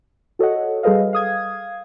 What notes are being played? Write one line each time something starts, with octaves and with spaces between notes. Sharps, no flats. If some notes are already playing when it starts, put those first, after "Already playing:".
F#4 A4 C#5 D#5 F#5
G3 G#4 A4 B4 D#5 F5
F5 D#6 G#6